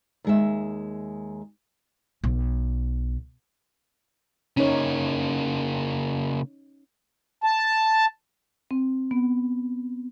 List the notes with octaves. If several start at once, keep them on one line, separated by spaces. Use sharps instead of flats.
D#2 G#3 E5
B1
C#3 A#3 C#4 D#4 C#5
A5
C4
B3